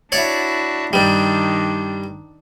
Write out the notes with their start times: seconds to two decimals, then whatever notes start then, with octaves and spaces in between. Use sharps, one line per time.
0.12 D4 E4 F#4 C#5 D5
0.93 G2 D#3 G3 D4 D#4